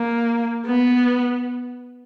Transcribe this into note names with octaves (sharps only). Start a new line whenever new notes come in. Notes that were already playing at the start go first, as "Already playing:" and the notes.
Already playing: A#3
B3